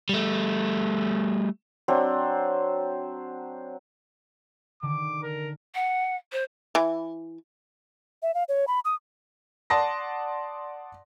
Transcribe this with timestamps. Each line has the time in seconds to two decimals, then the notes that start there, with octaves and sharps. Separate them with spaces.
0.09 G3 A3
1.88 F#3 C4 D4 C5
4.82 D3 D#3 D6
5.23 A#4
5.75 F#5
6.32 C5
6.75 E3
8.23 E5
8.34 F5
8.49 C#5
8.68 B5
8.85 D#6
9.70 D5 F#5 A5 C6 D#6 A#6